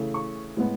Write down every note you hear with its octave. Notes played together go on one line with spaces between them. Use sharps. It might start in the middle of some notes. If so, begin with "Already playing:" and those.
Already playing: C#3 E3 A3
C#6
A2 G#3 B3